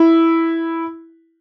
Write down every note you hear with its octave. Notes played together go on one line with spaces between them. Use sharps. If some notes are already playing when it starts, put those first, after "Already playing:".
Already playing: E4